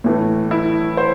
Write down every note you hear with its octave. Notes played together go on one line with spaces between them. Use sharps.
A2 E3 A3
E4
C5